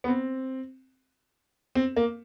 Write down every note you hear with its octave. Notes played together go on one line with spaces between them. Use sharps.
B3
C4
C4
A#3